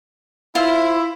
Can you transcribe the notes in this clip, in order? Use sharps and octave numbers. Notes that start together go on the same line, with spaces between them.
E4 F4 C5